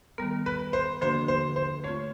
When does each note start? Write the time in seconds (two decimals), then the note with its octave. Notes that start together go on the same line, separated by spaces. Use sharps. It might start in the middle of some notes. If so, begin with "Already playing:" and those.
0.18 D#3 G3 B3 A#4
0.46 B4
0.73 C5
1.01 D3 F3 A#3 D4 F#4 C5
1.28 C5
1.56 C5
1.84 A3 C4 F4 C#5